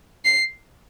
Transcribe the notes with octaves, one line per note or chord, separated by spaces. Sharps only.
C7